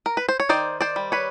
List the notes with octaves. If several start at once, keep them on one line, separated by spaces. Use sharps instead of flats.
A#4
B4
C5
C#5
D#3 C5 D5
C5 D5
G3
B4 C#5